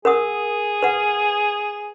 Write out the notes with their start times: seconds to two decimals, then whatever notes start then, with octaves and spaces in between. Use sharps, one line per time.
0.05 G#4 A#4 F#5 D#6
0.83 B4 F#5